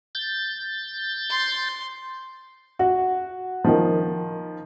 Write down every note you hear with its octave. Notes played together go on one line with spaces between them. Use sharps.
G6 A6
C6
F#4
D#3 F3